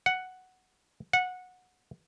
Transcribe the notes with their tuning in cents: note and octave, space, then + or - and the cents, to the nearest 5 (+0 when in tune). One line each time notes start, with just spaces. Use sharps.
F#5 +5
F#5 -15